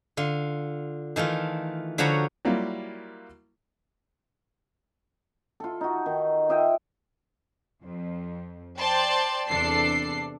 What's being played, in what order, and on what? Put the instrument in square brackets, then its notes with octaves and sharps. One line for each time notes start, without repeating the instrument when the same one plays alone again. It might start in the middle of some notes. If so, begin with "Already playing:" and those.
[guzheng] D3 F4
D#3 E3 A3 F4
D3 F3 F#4 C#5 A#5 B5
[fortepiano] F#3 G3 A#3 E4 F4
[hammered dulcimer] F4 A4
D#4 F#4
D#3
F4 D#5 E5 G5
[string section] F2
C5 D5 G5 A5 C6
E2 C3 D4 A4 C7